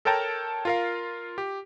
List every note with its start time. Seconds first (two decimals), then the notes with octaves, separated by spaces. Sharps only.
0.05 A4 A#4 C#5 G5 A5 A#5
0.65 F4 A#4 F5
1.38 G4